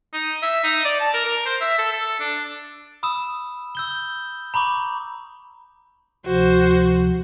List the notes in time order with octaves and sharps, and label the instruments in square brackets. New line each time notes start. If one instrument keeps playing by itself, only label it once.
[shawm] D#4
E5
D#4
D5
A5
A#4
A#4
C5
E5
A4
A4
D4
[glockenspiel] B5 D#6 E6 E7
E6 G6 G7
A#5 B5 C#6 D6
[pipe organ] D2 C3 F3 [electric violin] F#4 C5